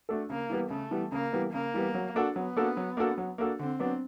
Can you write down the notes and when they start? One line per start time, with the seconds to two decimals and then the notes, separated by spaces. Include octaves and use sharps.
0.09 A3 D4 F#4 A4
0.30 C#3 A#3
0.50 E3 G3 B3
0.70 C#3 A3
0.91 E3 G3 B3
1.12 C#3 A#3
1.33 E3 G3 B3
1.53 C#3 A#3
1.74 E3 G3 B3
1.94 F#3
2.15 A#3 D4 F#4 A4
2.35 F#3 B3
2.57 A#3 D4 F#4 A4
2.77 F#3
2.97 A#3 D4 F#4 A4
3.18 F#3
3.38 A#3 D4 F#4 A4
3.59 D3 C4
3.80 F#3 B3 D4